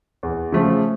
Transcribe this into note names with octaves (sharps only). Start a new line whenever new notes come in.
E2
C#3 F3 A3